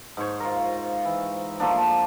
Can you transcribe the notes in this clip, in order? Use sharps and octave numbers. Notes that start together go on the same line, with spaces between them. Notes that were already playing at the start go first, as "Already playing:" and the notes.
G#2 C5 C#5
F4 A#4
E3
F3 A3 A#3 D4